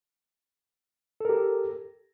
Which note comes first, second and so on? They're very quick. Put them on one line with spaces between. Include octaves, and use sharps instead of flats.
A4 A#4 G4